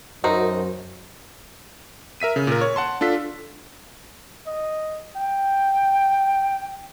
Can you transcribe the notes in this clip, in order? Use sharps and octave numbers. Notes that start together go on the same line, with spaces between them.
F#2 A3 D#4 F#4 A#4 C5
A#4 E5 B6 D#7
C#3
A#2 A#4
C#5
F#5 A5 C6
D4 F4 A4 B6
D#5
G5